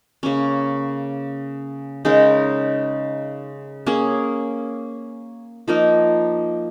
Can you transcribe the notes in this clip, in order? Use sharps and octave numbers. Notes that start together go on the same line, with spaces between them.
C#3 A#3 C#4
C#3 G#3 D#4 A#4
A#3 C#4 G#4
F3 A#3 D#4 A#4